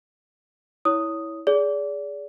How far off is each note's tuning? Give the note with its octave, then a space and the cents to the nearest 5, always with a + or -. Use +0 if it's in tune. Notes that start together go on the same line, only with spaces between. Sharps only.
E4 -15 C#5 +15 D#6 +0
G#4 +0 D5 -30